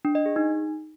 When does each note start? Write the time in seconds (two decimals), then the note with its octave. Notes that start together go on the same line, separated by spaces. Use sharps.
0.05 D4
0.15 D#5
0.26 G#4
0.36 D#4